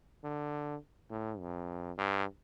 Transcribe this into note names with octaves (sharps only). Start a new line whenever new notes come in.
D3
A2
F2
G2